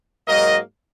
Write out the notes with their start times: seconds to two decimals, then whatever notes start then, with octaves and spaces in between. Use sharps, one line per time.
0.27 G#2 F#3 A#3 A#4 D#5